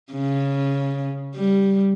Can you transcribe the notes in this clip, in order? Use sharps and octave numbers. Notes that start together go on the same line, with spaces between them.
C#3
G3